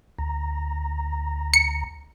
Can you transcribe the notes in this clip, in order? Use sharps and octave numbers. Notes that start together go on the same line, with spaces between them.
D2 A#5
C#7